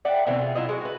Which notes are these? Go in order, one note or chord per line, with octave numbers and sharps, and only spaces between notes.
D5 E5 F#5 G5
B2 D3 E3 C4
F4 G#4
F#3 E4 F4 D#5
G#3 F#4
F#4 B4